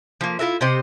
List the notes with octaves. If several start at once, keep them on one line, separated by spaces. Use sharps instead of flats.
F3 A#3
E4 F4 A#4 E5
C3 G4 C5 D#5